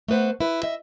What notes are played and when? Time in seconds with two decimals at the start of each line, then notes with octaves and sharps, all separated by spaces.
0.08 A3 B3 B4 C5 F#5
0.40 E4 B4
0.63 D#5 E5